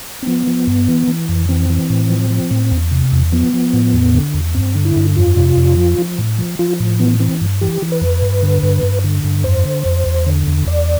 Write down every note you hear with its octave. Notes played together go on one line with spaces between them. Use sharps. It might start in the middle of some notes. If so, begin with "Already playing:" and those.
C4
F3 B3
F3
G2
E3
E3
F2
E3 C4
E3
A2
F3
F3
A2
E2
C3
E2
F3 B3
F3
A2
E2
D3
E2
G2 C4
D3
E4
G2
F2 F4
C3
F2
F3
F3
A2
F3
F3 F4
A2
E3 B3
E3 C4
G2
E3 G4
E3
B4
F2
G2
D3
G2
G2
D3
G2
F2 C5
D3
F2
E2
D3
E2
E2 D5